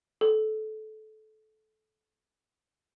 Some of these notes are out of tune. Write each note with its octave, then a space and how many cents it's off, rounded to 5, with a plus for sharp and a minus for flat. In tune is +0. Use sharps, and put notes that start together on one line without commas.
A4 -20